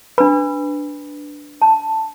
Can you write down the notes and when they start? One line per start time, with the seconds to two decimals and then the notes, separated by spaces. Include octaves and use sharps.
0.18 D4 B4 B5
1.62 A5